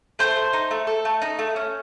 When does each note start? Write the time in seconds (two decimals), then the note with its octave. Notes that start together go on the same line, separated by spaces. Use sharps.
0.19 A3 C5
0.36 A3
0.53 D#4
0.71 A3
0.87 A4
1.05 A3
1.22 D#4
1.39 A3
1.56 C#4